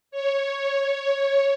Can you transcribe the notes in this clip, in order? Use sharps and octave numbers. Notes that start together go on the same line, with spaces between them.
C#5